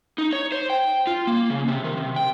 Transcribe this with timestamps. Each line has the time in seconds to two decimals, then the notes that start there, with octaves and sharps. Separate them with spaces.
0.18 D#4
0.33 C#5
0.52 C5
0.70 G5
1.07 F4
1.27 A#3
1.50 C#3
1.68 C3
1.84 D#3
1.97 C3
2.16 G5